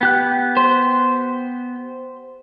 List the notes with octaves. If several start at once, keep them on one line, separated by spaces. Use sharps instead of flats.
B3 G4 F#6
C5